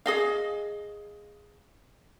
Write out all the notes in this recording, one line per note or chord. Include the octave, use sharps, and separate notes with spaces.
G#4 D#5 F5